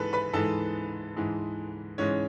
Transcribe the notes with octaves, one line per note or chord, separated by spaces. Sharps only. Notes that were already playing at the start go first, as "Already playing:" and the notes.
Already playing: G#2 E3 G#3 A4 B4 A5 B5
B4 B5
G#2 E3 G#3 A4 A5
G#2 E3 G#3
G#2 E3 G#3 C#4 C#5